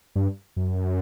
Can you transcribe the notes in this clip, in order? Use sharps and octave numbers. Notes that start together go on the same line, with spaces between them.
G2
F#2